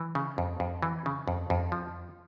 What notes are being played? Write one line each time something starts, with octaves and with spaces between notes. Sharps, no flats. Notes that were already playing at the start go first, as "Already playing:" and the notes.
Already playing: E3
C#3
F2
F2
E3
C#3
F2
F2
F3